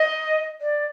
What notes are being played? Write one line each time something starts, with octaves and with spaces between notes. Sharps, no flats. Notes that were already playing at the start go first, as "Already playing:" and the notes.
Already playing: D#5
D5